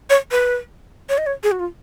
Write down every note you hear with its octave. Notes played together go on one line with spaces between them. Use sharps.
C#5
B4
C#5
D#5
C#5
G#4
F#4
F4